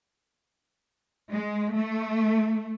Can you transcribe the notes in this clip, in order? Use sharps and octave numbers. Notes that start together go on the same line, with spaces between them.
G#3
A3